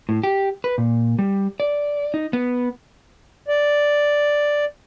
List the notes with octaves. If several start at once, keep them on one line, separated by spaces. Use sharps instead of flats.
A2
G4
B4
A#2
G3
D5
D#4
B3
D5